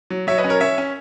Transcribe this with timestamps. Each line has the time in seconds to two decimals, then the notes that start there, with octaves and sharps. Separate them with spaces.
0.10 F#3
0.27 F#3 C#5 E5
0.38 B4 D#5
0.44 C#4
0.49 A#4 C#5
0.60 C#4 C#5 E5
0.78 C#4